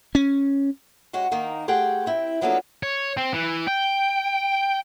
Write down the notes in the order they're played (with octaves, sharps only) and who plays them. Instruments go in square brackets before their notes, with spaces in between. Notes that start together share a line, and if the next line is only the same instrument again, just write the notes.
[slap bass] C#4
[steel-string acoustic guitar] G#3 C#4 F#4 G4
D#3 A#3 D#4
A3 G4 G#4 C5 F#5 G5
C4 E4 G5
F3 F#3 A#3 B3 D4 A4
[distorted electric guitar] C#5
C4
E3
G5